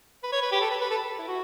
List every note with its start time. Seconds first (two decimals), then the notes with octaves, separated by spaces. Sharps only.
0.23 B4
0.32 C#5
0.42 B4
0.51 G4
0.61 A4
0.70 B4
0.81 B4
0.90 A4
1.19 E4
1.28 F#4